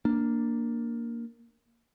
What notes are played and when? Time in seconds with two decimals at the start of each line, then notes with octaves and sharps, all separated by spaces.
0.05 A#3 D4